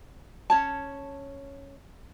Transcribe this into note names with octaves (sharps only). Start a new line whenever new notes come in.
C#4 C#5 A5